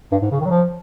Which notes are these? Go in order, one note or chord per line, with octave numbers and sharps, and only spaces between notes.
G2
G#2
C#3
D#3
F#3
F3